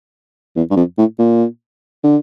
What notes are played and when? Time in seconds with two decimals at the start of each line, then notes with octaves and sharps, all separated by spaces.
0.56 E2
0.71 G2
0.76 F2
0.98 A2
1.19 A#2
2.04 D3